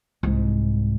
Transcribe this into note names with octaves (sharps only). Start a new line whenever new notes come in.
C2 G#2